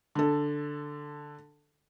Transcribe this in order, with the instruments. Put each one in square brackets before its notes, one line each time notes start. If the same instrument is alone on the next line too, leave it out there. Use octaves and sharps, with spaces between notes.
[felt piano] D3 A4